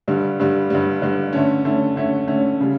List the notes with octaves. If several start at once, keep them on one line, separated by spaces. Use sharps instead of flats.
G2 D3 G3
G2 D3 G3
G2 D3 G3
G2 D3 G3
D3 A3 C#4
D3 A3 C#4
D3 A3 C#4
D3 A3 C#4
C#3 G3